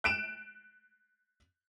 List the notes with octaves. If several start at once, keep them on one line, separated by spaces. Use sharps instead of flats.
F#6 D7 E7